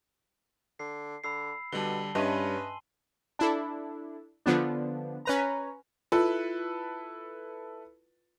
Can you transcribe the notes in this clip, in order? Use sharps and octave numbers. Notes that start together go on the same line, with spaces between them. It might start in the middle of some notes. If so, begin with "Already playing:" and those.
D3 C7
D3 B5 E6 C7
B2 D3 G3 A5 F#7 G7
G2 C#4 B4 D#5 E5 G#5 C6 D#7
D4 E4 A4
D3 F3 B3 D4
C#4 B4 A#5
E4 F4 A4 B4